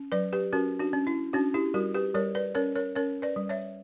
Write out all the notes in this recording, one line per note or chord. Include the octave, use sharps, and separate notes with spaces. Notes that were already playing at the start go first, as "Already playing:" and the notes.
Already playing: C#4
F#3 B4 D5
G4 B4
C#4 F#4 A#4
D4 F#4
C#4
E4
C#4 D4 F#4
E4 G4
G3 F#4 A#4
G4 B4
G3 A#4 C#5
B4 D5
C#4 A#4 C#5
A#4 C#5
C#4 A#4 C#5
B4 D5
G3
C#5 E5